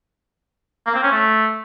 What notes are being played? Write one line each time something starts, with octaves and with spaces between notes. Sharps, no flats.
A#3
C4
C#4
A3